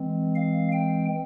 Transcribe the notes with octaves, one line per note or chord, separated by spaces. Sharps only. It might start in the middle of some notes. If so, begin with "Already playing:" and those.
Already playing: E3 G#3 C4
F5
G5